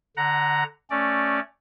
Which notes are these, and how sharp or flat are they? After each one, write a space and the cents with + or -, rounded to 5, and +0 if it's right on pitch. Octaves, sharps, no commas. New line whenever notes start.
D3 +0 F#5 +15 A#5 +0
A3 +0 C#4 +0 D5 +0